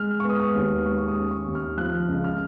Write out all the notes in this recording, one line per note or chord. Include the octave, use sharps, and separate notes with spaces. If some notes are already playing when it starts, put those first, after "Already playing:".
Already playing: G#3 F6
B3 C#6
D#6
F6
D#2
G#3 C#6
C#6
D#6
C#4
C#6
D#2
F6
F3 F#6
C#2
F6